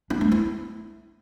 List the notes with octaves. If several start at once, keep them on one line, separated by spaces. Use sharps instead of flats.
D4
A3
E4